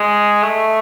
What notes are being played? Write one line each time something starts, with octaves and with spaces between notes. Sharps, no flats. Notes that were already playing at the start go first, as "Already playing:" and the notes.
Already playing: G#3
A3